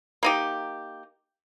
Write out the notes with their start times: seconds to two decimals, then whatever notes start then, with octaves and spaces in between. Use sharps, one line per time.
0.23 A#3 D#4 G4